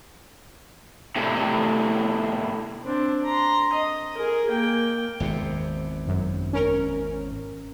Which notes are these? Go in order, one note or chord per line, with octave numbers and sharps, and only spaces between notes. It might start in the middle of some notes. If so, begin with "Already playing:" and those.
A2 C3
C4 D4
A#5 C6
D#5
G#4 A#4
A#3 G5
G#1 E2 C3
F#2
C#4 A#4